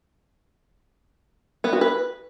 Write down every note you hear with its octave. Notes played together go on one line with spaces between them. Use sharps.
B3
F#4
B4